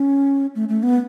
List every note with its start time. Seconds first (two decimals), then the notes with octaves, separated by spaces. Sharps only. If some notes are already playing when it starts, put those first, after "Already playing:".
Already playing: C#4
0.55 A3
0.69 A3
0.83 B3